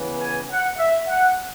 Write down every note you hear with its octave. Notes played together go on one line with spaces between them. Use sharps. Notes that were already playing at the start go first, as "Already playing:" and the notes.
Already playing: C#3 E3 B3
G#5
F#5
E5
F#5